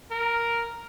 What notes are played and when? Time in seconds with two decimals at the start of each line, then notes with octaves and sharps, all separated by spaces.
0.11 A#4